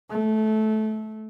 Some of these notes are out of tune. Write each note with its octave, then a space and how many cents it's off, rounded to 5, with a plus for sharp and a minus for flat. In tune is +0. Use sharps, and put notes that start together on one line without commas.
A3 -20